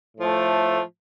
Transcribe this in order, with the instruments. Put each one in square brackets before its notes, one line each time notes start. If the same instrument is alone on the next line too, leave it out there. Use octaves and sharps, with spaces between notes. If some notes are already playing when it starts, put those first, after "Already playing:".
[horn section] A2 F3 A3